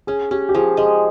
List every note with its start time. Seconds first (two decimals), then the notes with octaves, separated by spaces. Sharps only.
0.07 C#4 G#4
0.31 C#4 G4
0.49 G4
0.55 F3 G#4
0.77 G#3 G#4